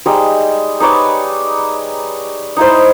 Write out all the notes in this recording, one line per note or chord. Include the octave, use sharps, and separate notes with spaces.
G3 G#3 D#4 G5
D#4 B4 C#5 D5
D#4 E4 C5